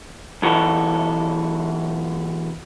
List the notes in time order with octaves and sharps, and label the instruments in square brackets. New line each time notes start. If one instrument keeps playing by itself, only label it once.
[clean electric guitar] B1 E3 F#4 A4